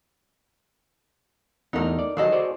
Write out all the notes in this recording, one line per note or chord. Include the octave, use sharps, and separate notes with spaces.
E2 A3 D#4 A#4 F#5
D5
D#3 F#3 G#4 A4 D#5
F#4 C5 D5